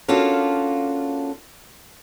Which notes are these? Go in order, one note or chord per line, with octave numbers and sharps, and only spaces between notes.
A#3 C#4 D4 F4 F#4 A4